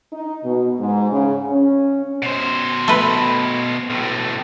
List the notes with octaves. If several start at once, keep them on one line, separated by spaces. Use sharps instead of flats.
D#4
B2
G#2
C#3
C#4
B2 C5
A3 B4
B1 A2